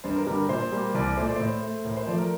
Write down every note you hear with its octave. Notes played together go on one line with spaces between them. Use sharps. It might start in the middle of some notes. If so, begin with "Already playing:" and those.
G2 C5
A#4
D3 G3 A#4
A#4
A#2 C5
G3 A#3
C2 D5
A#2 A3 C5
D5
A2 C5
A3
A2 A#4
C5
F3 A3 D5
A#4